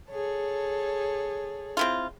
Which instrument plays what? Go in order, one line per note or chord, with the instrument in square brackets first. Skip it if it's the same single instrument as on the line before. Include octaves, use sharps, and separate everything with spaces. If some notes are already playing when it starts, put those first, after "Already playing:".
[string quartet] G#4 A4 C#5
[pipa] C4 E4 F4